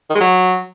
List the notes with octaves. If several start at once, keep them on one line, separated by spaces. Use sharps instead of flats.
D#3
G#3
F#3